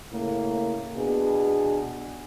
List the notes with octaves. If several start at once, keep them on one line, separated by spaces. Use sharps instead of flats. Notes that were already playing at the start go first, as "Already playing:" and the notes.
A2 C#3 A#3
B2 B3 D4 G#4